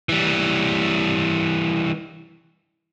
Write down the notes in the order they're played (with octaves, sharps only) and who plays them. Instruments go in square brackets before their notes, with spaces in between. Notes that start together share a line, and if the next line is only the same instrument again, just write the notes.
[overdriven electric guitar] E3 G3